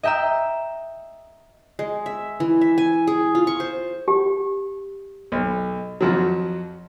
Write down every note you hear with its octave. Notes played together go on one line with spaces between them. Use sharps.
D#5 E5 G5 A#5 E6
G#3
E5
E3
E5
G#5
G#4
F4
C#6
C5
G4
B1
F2 F3 F#3